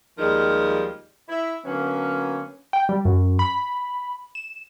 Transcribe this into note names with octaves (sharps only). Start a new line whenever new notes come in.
D#2 F3 G3 G#3 D#4 A#4
E4
D3 F#3 A#3 B3 C#4
G5
G3
F#2
B5
E7